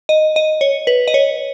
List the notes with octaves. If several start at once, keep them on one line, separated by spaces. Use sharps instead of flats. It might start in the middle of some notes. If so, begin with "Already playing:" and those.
D#5
D#5
C#5
B4
D#5
C#5